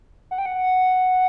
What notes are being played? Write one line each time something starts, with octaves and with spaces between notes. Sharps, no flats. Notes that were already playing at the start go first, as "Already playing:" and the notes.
F#5
G5
F#5